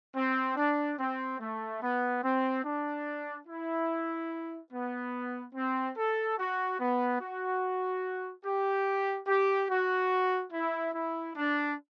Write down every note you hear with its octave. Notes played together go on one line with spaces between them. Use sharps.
C4
D4
C4
A3
B3
C4
D4
E4
B3
C4
A4
F#4
B3
F#4
G4
G4
F#4
E4
E4
D4